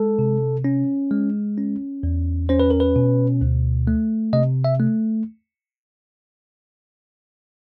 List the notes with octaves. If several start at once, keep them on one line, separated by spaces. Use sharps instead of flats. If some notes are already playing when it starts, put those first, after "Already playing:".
Already playing: G#3 A4
C3
C#4
G#3
C#4
E2
C#4 C5
B4
A#4
B4
B2
D2
A3
C3 D#5
E5
A3